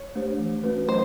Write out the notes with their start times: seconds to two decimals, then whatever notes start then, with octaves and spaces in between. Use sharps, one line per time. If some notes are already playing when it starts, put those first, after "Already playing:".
Already playing: C#5
0.15 A3 D4 G4 C5
0.39 E3
0.64 A3 C#4 F#4 B4
0.88 F#3 C5